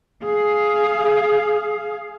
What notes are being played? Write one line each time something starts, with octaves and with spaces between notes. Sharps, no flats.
G#4 F5